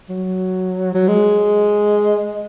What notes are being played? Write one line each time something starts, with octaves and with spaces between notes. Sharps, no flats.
F#3
F#3
G#3